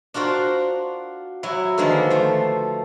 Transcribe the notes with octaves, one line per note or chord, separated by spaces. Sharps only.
D4 F4 F#4 A#4 C5
F#3 E4
D3 D#3 F3 G#3 A#3 B3
A3 C5